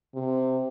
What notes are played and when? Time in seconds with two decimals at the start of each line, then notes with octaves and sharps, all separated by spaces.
0.15 C3